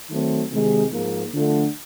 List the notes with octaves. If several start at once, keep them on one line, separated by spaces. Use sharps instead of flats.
D#3 F#3 A3 C4
C3 D#3 G#3
G#2 F3 A#3
D3 F3 A3